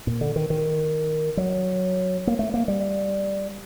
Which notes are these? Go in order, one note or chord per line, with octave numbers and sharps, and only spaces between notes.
A#2
D3
D#3
D#3
F#3
A#3
A3
A#3
G3